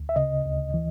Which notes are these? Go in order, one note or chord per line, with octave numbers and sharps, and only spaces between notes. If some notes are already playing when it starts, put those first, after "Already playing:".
Already playing: D2
E5
C#3 D#5
D2
E3